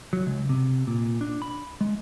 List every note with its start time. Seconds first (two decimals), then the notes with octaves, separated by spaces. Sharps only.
0.13 F#3
0.27 C#2
0.49 C3
0.87 A#2
1.21 D4
1.42 B5
1.81 G#3